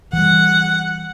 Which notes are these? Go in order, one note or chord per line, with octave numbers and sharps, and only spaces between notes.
E3 G3 F#5